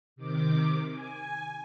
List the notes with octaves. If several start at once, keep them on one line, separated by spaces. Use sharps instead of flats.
C3 D#3 D6
G#5